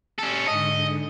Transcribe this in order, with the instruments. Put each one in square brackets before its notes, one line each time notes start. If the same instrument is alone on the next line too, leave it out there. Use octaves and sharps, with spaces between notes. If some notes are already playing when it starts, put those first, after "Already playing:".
[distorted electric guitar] C#4 A4
[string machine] G#2 D3 [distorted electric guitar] D#5